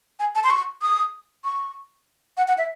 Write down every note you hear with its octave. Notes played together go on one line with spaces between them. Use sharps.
G#5
A5
C6
C#6
D#6
C#6
F#5
F#5
E5